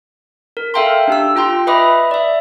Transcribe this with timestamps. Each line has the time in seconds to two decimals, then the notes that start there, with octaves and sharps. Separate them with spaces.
0.57 A#4
0.74 A4 E5 F5 G5 A#5 C6
1.08 D4 G4 E6
1.36 F4 G5 A#5 C6
1.67 B4 D#5 E5 B5 D6 D#6
2.11 D5 E5